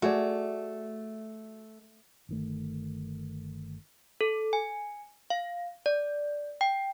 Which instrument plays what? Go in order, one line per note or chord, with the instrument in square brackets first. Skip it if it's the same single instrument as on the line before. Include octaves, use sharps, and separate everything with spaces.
[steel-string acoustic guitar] A3 [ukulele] F#4 G#4 D5
[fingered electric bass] G1 D#3 A3
[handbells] A4
G#5
F5
D5
G5